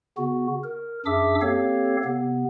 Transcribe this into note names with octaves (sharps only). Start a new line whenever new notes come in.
C#3 B3 F#4
A#4
F#2 D4 G#4 E5 D6 E6
A#3 C4 G4 A4 C#5 F5
C3 B3